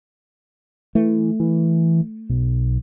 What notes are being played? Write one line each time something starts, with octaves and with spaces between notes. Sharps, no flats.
E3 A3
E3
B1